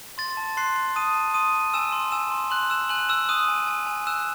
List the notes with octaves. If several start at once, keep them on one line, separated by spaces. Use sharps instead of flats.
C6 A6
A5
C6 F#6 C7
C6
A5 D#6 D#7
A5
C6 D#6 D#7
A5
G#5 E6 E7
C6
G#5 E6 E7
C6
C6 F#6 F#7
E6 F#6 E7
G#5 F#6 F#7
E6 F#6 E7
D#6 F#6 D#7
G#5
G#5
G#5
E6 F#6 E7